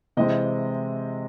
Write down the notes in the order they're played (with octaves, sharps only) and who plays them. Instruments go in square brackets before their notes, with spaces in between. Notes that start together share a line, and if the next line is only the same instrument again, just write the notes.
[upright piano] C3 E3 G#3 C4 D#5